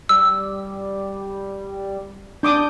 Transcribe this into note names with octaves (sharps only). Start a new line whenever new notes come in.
G3 E6
D4 D6 D#6 G6